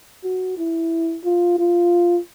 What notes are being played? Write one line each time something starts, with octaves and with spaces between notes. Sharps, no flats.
F#4
E4
F4
F4